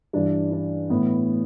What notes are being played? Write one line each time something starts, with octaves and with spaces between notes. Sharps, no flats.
G2 E3 D4
D4
A2 E3 B3